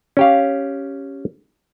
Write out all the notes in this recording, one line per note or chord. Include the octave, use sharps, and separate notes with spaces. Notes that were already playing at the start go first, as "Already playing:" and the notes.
C#4 G4 F5